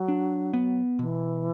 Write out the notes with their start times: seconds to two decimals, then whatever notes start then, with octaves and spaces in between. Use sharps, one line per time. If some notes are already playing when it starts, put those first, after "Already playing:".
Already playing: F#3
0.08 D4
0.53 B3
0.99 B2 E3